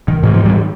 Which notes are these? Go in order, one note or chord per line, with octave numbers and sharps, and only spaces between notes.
D#3
G#2 D#3
F3
D#3 G3